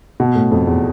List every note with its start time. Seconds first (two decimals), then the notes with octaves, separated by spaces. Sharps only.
0.20 B2
0.35 A2
0.51 F2
0.67 E2